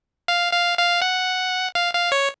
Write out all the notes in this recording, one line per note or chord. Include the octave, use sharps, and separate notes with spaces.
F5
F5
F5
F#5
F5
F5
C#5